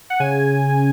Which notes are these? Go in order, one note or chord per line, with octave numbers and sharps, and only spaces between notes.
F#5
C#3 G#5